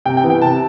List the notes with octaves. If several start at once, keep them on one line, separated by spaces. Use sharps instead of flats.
C3 G5
G5
E3 B3
G5
C3 A5